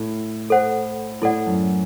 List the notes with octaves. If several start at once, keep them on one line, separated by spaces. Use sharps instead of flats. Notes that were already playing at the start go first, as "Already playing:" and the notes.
Already playing: A2
A4 C5 F#5
A2 E4 A4 D5 F#5
F#2